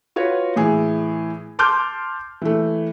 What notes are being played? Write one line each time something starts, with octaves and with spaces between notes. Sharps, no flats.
F4 F#4 B4 C#5
A2 E3 G#4
A5 C6 D6 F6 G6
E3 A3